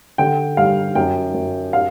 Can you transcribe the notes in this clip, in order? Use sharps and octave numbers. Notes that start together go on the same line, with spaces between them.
D3 G5
G2 F5
F#2 G5
F#2
F5